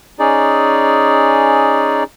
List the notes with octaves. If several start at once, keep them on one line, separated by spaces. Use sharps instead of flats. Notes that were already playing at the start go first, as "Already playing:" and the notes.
C#4 D#4 G#4 D5